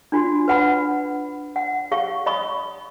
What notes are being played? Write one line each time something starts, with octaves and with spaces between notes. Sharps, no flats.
D4 F4 F#4
B4 F#5 B5
F#5
G4 F5 C#6
D#5 B5 C#6 D#6